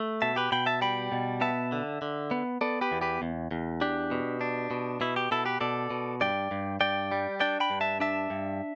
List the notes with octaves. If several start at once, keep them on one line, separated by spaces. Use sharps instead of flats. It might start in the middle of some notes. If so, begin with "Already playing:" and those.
Already playing: A3
B2 E5 A5
G4 B4
B2 G5 B5
E5 A5
G3 G5 B5
B2
B3 E5 A5
D3
D3
B3
B3 A4 D5
G4 B4
E2
G4 B4
E2
E2
D4 G4
B2
D4
B2
B2 E4
G4
B2 E4 A4
G4 B4
B2 A4 D5
B2
G2 D5 G5
G2
G2 D5 G5
G3
D4 D5 G5
G5 B5
G2
E5 A5
D4 E5 A5
G2